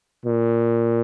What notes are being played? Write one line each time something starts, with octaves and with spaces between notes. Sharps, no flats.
A#2